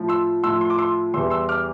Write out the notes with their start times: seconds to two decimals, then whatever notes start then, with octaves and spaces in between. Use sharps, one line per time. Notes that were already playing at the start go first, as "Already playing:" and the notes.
Already playing: A2 F3
0.09 C6 E6
0.43 A2 F3 C6 E6
0.61 C6
0.70 D6
0.79 C6 E6
1.14 E2 E3 G3 C6 E6
1.30 C6 E6
1.49 D6 F6